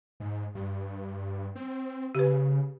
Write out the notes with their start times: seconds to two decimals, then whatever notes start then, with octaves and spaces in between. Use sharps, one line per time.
0.20 G#2
0.55 G2
1.55 C4
2.15 C#3 G4 B4